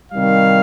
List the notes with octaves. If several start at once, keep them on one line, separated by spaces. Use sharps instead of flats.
C3 D#3 G3 F5